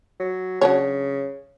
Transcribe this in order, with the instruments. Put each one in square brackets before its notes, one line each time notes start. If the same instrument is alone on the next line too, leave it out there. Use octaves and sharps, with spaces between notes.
[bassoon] F#3
[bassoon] C#3 [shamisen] F#3 D4 C#5